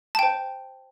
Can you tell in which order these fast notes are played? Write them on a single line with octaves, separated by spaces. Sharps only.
A5 G5 C5